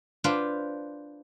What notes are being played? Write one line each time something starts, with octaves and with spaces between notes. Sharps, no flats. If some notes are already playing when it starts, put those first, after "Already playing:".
D4 F4 B4 C5